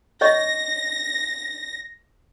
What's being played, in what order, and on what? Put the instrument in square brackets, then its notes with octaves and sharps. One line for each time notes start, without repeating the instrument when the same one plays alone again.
[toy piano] C#5 D#5 C#6 [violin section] A#6